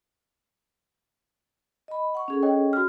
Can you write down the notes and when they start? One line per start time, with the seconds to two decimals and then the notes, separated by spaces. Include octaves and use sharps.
1.88 D#5 B5
2.15 F#5 C#6
2.28 C#4 G#4 A4
2.43 C#5 D#5 G5
2.73 F#4 F6